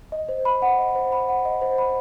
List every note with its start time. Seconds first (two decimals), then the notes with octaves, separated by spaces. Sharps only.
0.12 D#5
0.29 C5
0.45 B5
0.62 F#5
0.79 D#5
0.95 C5
1.12 B5
1.29 F#5
1.45 D#5
1.61 C5
1.78 B5